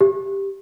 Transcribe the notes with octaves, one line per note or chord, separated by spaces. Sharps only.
G4